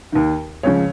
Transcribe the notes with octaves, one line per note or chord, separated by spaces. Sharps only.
D#2 D#3
C#2 C#3 F3 C#5